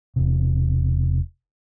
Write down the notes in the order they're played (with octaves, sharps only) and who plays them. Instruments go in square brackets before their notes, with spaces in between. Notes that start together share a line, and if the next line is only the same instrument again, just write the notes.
[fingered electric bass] E1 C3